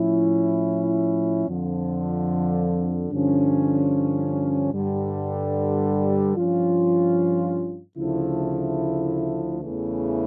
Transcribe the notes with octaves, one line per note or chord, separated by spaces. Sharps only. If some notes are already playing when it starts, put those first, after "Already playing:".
Already playing: A2 F3 C#4 E4
F2 D3 F3
G2 D3 F3 C#4
G2 D3 G3
G2 F3 C#4 F4
D2 C#3 F3 A3 E4
E2 C#3 E3 A3